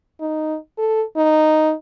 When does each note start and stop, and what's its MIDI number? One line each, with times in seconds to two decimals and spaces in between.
0.21 0.57 63
0.78 1.03 69
1.17 1.73 63